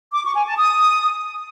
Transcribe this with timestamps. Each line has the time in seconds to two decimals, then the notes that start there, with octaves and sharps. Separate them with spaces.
0.13 D6
0.24 C#6
0.35 G#5
0.46 A5
0.57 D#6